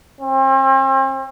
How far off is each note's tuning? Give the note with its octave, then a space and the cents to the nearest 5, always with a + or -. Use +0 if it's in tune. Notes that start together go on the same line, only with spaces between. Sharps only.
C4 +40